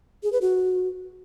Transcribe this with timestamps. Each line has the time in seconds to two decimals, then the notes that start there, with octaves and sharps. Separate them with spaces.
0.23 G#4
0.32 B4
0.41 F#4